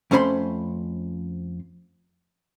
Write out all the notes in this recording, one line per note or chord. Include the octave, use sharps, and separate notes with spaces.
F2 A3 C#4 C5 B5 C6